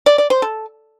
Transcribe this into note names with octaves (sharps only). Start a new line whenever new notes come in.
D5
D5
C5
A4